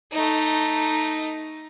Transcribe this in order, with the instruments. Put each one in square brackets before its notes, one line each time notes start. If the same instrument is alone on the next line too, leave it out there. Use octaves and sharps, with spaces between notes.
[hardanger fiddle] A3 D#4